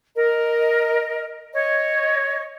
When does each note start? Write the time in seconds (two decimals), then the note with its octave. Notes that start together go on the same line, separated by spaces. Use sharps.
0.16 A#4 D#5
1.53 C#5 D#5